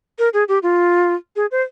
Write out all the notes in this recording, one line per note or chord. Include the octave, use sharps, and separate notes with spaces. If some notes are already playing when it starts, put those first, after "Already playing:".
A#4
G#4
G4
F4
G#4
C5